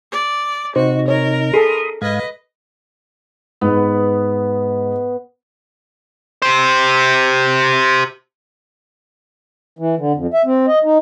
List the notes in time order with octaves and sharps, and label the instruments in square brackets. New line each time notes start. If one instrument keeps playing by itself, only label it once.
[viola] D5
[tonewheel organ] C3 D#4 [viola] F#4 [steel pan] C5
[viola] A#4 [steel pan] C#5
[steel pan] G#4 A4 A5 [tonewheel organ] B5 C6 D#6
[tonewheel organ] G#2 F5 G#6 [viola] B4 D#5
[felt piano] G#2 [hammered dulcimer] B3
[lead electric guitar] G4 C5
[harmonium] E3
D3
F2
E5
C4
D#5
D#4